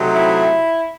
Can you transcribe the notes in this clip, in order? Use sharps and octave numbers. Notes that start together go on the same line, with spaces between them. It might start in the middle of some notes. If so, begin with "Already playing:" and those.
Already playing: C3 F#3 A3 C4 D#4
E4